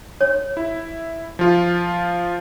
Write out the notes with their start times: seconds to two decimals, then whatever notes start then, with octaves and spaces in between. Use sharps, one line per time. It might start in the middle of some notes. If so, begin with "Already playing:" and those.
0.21 C#5
0.57 E4
1.39 F3 F4